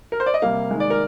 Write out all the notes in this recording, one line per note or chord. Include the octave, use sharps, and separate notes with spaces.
A#4
C5
D5
D#5
C3 G3 A#3 F5
D#3 G#3
D5
A#4